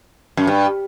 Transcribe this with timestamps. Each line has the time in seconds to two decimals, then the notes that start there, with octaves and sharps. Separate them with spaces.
0.37 F#2
0.47 G2